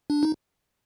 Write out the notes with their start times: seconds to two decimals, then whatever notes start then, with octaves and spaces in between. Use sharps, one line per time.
0.10 D4
0.23 D#4